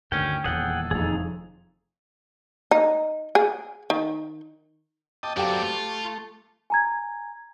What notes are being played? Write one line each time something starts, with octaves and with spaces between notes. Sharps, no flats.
D2 G2 D#3 C#4 G5
D#1 E2 G#4 A4 F#5 G5
F1 F2 D#4 G#4
D#4
G#4
D#3
D#5 G5 A5 D6
F#2 B3 C4 G4 A4 D5 F5 G5
A3 F4
G#5 A#5 G#6